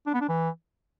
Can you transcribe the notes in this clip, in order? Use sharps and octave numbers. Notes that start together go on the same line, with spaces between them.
D4
B3
D4
E3